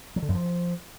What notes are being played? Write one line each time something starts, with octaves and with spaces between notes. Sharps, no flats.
F#3
D3
F#2
F3